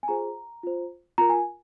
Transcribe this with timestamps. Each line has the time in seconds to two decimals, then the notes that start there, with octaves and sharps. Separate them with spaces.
0.03 G#5
0.08 F4 G#4 C5 A#5
0.63 F4 C5
1.18 F4 A#4 A#5
1.30 G#5